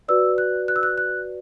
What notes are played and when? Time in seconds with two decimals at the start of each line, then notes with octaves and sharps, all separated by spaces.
0.08 F#4 B4 D5 E6
0.38 F#6
0.68 F#6
0.76 E6
0.83 F#6
0.98 F#6